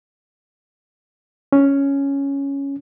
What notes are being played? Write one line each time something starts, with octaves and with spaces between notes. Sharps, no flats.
C#4